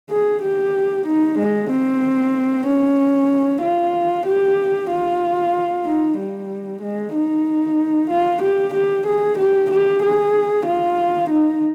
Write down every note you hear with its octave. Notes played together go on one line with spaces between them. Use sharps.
G#4
G4
D#4
G#3
C4
C#4
F4
G4
F4
D#4
G3
G#3
D#4
F4
G4
G4
G#4
G4
G4
G#4
F4
D#4